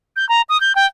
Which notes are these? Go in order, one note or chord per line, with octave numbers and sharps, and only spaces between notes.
G6
A#5
D#6
G6
G5